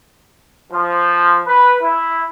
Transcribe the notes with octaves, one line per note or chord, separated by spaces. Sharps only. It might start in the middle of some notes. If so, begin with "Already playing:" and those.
F3
B4
E4